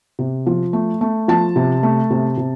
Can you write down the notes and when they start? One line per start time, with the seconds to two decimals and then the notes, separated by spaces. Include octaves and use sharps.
0.19 C3
0.47 F3
0.73 A3
1.01 A3
1.28 F3 A5
1.56 C3
1.83 A3
2.11 C3
2.38 C3